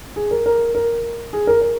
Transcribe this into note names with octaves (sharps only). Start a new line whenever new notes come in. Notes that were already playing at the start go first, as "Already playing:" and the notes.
G#4
A#4
A#4
A#4
G#4
A#4
A#4